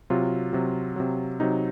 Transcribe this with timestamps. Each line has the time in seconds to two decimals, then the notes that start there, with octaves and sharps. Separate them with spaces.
0.10 C3 F#3 F4
0.53 C3 F#3
0.96 C3 F#3
1.40 C3 F#3 D#4